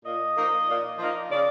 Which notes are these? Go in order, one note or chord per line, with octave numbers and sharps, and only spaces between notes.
A#2 D#5
F3 A#3 D#4
A#2
F3 A#3 D#4
C#3 D5